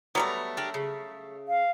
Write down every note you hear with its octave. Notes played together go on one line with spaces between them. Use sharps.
F#3 G3 A3 B3 A#5
D4 G4 A#4
C#3
F5